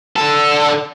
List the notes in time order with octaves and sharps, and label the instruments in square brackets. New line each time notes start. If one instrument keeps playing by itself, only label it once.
[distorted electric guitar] D3 A4